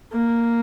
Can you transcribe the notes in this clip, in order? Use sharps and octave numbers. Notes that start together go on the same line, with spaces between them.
A#3